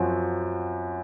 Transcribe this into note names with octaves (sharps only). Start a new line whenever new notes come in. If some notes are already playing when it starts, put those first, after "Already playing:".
Already playing: F#2 F3 C4 F#4